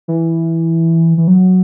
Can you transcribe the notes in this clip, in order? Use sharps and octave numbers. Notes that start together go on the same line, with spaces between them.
E3
E3
F#3